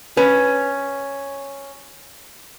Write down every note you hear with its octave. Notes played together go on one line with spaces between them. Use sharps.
C#4 B4